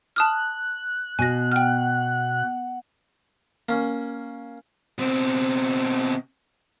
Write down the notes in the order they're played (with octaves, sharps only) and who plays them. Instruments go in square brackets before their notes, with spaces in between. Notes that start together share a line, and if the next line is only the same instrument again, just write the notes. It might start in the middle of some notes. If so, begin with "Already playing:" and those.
[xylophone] A5 D#6 F6 [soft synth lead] F#6
[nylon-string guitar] B2 [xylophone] G#5 A#6
[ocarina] F#5 [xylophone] G5 F6
[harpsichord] A#3 C#4
[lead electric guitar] B2 C4